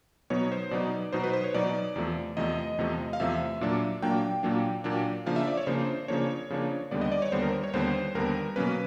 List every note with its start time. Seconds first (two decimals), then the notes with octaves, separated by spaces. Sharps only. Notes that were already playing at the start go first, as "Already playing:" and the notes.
0.30 B2 F#3 B3 D#4 C#5
0.52 C5
0.71 B2 F#3 B3 D#4 D5
1.13 B2 F#3 B3 D#4 C5
1.24 B4
1.33 C5
1.44 C#5
1.54 B2 F#3 B3 D#4 D5
1.96 E2 C3 F3 A3
2.37 E2 C3 F3 A3 D#5
2.78 E2 C3 F3 A3
3.13 F5
3.20 E2 C3 F3 A3 E5
3.61 A#2 F#3 A#3 D4
4.02 A#2 F#3 A#3 D4 G5
4.43 A#2 F#3 A#3 D4
4.84 A#2 F#3 A#3 D4
5.26 C#3 F3 A#3 D4 F5
5.36 E5
5.47 D5
5.57 C#5
5.67 C#3 F3 A#3 D4 C5
6.08 C#3 F3 A#3 D4 C#5
6.50 C#3 F3 A#3 D4
6.91 D#2 D3 G3 B3 D5
7.01 D#5
7.12 D5
7.22 C#5
7.32 D#2 D3 G3 B3 C5
7.42 A#4
7.64 C#5
7.73 D#2 D3 G3 B3 C5
8.15 D#2 D3 G3 B3 A#4
8.56 B2 F#3 A#3 C#4 B4